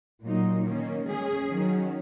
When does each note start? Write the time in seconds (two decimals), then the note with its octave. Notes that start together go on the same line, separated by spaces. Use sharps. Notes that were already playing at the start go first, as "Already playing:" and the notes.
0.23 A#2 F#3 A#3 D#4
0.65 D#3 A#3 C#4
1.06 G#3 C#4 G#4
1.48 D#3 F#3 C#4